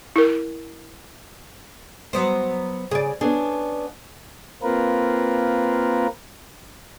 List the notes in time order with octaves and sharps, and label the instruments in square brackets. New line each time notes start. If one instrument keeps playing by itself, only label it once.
[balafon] E4 A#4
[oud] F#3 B3 C5
[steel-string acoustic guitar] C#3 [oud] G#4 D5
[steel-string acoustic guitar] B3 C#4 D4 [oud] G#4
[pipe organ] A#3 C4 F4 A#4 B4